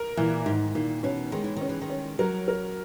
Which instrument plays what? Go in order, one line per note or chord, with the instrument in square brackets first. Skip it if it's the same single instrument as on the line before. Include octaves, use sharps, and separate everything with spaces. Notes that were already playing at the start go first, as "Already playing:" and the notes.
Already playing: [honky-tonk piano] A#4
[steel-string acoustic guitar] A#2 [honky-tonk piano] E3
[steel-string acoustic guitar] G#2 [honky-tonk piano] D#3
[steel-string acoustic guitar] A#2 [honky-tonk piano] D#3
[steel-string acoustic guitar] B2 [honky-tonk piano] C#4
[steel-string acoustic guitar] D#3 [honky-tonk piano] G#3
[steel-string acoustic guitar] E3
[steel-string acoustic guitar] D#3 [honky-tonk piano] C#4
[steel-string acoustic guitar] E3
D#3
[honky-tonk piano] C#4
[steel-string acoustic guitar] F#3 [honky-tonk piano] A#4
[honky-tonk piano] A#4